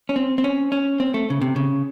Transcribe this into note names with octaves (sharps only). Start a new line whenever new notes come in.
C#4
C4
C4
C#4
C#4
C4
A3
C#3
C3
C#3